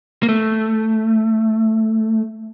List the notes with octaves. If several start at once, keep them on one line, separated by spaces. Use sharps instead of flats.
A#3
A3